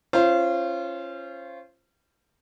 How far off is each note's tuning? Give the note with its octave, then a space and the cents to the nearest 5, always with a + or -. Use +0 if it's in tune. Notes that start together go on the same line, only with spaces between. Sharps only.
C#4 -15 F4 -25 C5 +0